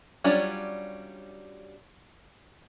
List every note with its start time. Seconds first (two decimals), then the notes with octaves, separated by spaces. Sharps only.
0.24 F#3 G3 C#4 D4 F4